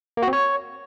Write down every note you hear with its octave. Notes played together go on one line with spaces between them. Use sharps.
A#3
F#4
C4
C#5